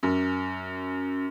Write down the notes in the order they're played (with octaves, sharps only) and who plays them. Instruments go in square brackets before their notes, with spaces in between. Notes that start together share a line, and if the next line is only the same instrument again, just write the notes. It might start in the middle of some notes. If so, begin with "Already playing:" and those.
[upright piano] F#2